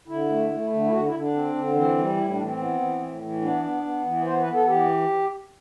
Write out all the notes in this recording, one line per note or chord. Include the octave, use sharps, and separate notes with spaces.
D3 E4
A3
A3
D3
E4
D3 F#4
E4
D3
D4
C4
D3
E3 C4
G3
A2 E4
D4
E3
C4
B3
E3
A2
E3
B3 D4
B3
B3
E3
B3 C5
B4
B3
A4
E3 G4